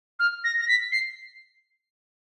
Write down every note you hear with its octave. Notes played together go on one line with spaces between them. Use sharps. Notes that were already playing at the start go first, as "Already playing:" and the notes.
F6
A#6
A#6
B6
C7